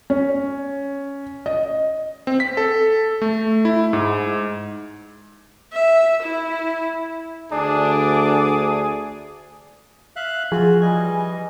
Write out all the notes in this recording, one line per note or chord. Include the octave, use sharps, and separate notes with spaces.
C#4
D#5
C4
B6
A4
A3
E4
G#2
E5
E4
D2 D4 G#4 D5
E5 F5 F#6
F3 F4 F#4 G#4
E3 G3 D#5 G#5